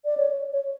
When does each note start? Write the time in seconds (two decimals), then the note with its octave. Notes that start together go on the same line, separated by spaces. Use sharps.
0.05 D5
0.17 C#5
0.53 C#5